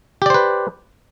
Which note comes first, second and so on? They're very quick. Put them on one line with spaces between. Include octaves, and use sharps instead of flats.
G4 D5 C5 B4